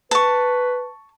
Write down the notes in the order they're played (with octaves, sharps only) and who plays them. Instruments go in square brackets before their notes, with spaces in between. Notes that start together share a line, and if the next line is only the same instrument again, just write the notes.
[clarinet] B4 [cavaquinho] A5 C#6